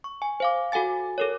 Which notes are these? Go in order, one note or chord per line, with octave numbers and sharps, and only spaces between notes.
C#6
G#5
C5 F5 D6
F#4 A4 F#5 G#5 A6
A4 A#4 C#5